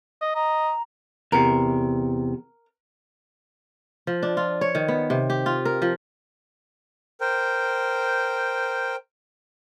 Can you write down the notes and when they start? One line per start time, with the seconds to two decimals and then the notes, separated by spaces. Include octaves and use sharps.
0.22 D#5
0.35 D#5 A#5
1.32 E2 C3 A#4
4.07 F3
4.23 D4
4.37 F4
4.61 C#5
4.75 D#3
4.88 B3
5.10 C3
5.30 G4
5.46 F4
5.65 A#4
5.82 F3
7.21 A#4 C5 G5